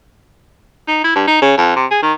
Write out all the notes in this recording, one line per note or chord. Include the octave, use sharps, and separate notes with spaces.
D#4
E4
G2
D#4
C#3
F2
C3
G#4
D#3